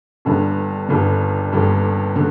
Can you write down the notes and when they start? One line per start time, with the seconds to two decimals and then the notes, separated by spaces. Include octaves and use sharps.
0.25 G1 G2 D3
0.89 G1 G2 D3
1.52 G1 G2 D3
2.16 D3